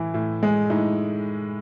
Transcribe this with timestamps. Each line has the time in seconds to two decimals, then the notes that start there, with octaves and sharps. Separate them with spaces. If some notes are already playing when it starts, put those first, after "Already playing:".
Already playing: A2 E3 E4
0.14 A2
0.43 G#3
0.70 A2 D#4